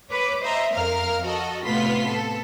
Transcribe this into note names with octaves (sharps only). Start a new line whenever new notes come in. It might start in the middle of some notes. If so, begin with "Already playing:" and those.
B4 C#5 D6
C5 D#5 E5 A#5
F2 A#4 F5 F6
F#4 A4 D#5
A2 C3 B3 F4 C6 B6
A4